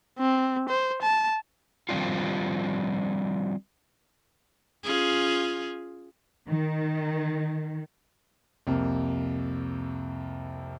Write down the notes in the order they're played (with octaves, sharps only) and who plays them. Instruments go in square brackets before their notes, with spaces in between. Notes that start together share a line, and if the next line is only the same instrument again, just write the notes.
[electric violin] C4
C5
A5
[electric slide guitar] D#3 F3 G3 C4 D4 F4
[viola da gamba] C#4 F4 G#4
[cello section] D#3
[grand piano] C2 F2 A#3